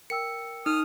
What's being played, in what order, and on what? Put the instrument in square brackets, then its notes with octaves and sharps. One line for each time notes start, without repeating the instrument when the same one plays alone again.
[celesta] A#4 G5 E6 [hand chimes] C#7
[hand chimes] D#4 [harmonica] D#6 F6